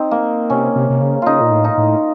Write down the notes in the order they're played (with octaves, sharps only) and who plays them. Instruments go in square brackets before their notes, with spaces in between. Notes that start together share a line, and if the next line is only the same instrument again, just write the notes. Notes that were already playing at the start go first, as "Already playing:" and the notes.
Already playing: [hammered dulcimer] C4 D#4
A#3
[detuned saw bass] C3 [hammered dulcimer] C#4
[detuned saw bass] C3
C3
C#3
[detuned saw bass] C#3 [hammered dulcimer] D#4 F4
[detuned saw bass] A#2
A2
[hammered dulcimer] D#4
[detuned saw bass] A2